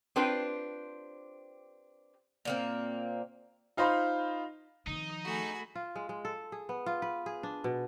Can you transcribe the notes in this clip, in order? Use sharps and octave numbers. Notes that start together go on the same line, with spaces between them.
C4 D4 F4 G4 B4 C5
A#2 A#3 C4
D#4 F4 C5 D#5 B5 C6
D#3 F3 D#4 D#6
A3 F#4 G#4 B5
F4
G#3
G#3
A4
G#4
B3
F4
B4
G#4
D4
B2